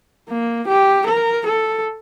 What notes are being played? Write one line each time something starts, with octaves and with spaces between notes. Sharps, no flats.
A#3
G4
A#4
A4